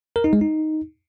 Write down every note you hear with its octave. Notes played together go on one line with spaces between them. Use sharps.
A#4
D#4
G#3
D#4